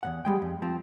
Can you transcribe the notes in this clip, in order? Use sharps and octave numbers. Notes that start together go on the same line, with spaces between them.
E2 G#2 F#5
G3 G#3 G5
F2
F3 C4